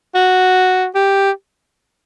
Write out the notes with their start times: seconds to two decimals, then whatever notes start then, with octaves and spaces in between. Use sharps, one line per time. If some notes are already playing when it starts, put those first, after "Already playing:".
0.15 F#4
0.95 G4